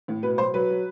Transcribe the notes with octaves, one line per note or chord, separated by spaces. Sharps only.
A2
B2 B4
F#3 C5
F#3 B4
F#3